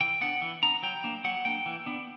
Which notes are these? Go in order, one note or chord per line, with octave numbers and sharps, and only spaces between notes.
E3 G5
B3 D4 F#5
E3
B3 D4 A#5
F#3 G5
A#3 D4
F#3 F#5
A#3 D4 G5
E3
B3 D4